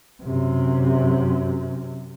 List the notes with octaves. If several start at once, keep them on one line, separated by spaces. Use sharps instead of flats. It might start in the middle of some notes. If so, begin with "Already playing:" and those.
F#2 C3